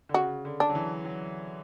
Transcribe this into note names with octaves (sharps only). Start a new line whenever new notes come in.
D3
C#3 F#4
D3
D4
F#3
E3
F#3